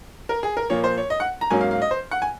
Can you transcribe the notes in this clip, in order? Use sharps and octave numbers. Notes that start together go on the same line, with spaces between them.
A#4
G#4
A#4
A#2 F3 A#3 C#5
C5
C#5
D#5
F#5
A#5
G#2 F#3 A#3 C#4 G#5
F5
F5
D#5
C5
F#5
G#5